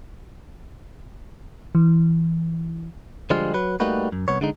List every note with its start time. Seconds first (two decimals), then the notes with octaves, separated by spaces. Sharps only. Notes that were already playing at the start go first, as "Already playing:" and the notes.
1.75 E3
3.30 D3 F3 G3 G#3 F4
3.54 F#3 B4
3.80 G3 A3 A#3 D#4 F#4 B4
4.12 F#2
4.28 C2 B3 C#5
4.41 D3 G#3 D#4